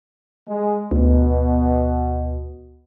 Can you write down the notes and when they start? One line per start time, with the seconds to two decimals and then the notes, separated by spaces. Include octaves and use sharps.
0.48 G#3
0.91 D2 B2